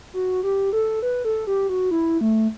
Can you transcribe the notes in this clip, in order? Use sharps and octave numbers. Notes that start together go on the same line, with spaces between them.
F#4
G4
A4
B4
A4
G4
F#4
E4
A3